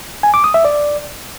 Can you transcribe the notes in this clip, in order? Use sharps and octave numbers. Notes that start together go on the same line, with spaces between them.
G#5
D6
D#6
E5
D5